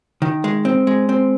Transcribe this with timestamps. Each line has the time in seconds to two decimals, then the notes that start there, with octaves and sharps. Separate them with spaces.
0.22 D#3
0.44 G#3
0.65 C4
0.87 G#3
1.09 C4